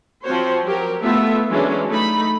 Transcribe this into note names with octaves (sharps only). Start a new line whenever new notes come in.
F3 C4 F#4 C5 C#5
F#3 G4 A#4
A3 B3 E4 F4 E5
E3 F#3 G#3 C#4 D4
A3 D#4 B5